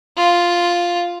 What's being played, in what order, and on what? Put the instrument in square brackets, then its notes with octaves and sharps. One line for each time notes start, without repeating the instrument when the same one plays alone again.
[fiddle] F4